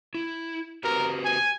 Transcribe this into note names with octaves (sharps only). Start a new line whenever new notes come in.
E4
F#4 G4 A#4 B4
G#5